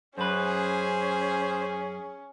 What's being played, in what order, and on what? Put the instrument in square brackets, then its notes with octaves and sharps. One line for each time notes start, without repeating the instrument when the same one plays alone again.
[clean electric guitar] F#2 B4 [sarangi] C#4 [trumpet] G#4 [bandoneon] C5